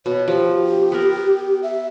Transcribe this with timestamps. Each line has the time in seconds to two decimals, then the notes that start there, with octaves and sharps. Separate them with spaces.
0.06 B2 C#5
0.28 F3 G4
0.92 B3 A#4
1.63 E5